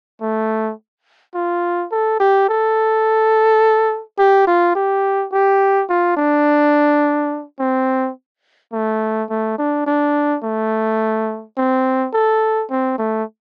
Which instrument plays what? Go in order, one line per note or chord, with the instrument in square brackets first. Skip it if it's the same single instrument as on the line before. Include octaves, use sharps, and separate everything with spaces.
[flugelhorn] A3
F4
A4
G4
A4
G4
F4
G4
G4
F4
D4
C4
A3
A3
D4
D4
A3
C4
A4
C4
A3